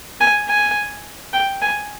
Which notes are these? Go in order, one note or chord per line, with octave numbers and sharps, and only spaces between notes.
G#5
G#5
G5
G#5